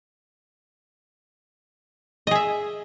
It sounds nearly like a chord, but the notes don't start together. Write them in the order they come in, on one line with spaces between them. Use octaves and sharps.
D#5 G#4 E5